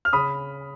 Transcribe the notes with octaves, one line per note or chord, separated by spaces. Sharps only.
F6
C#3 B5 D#6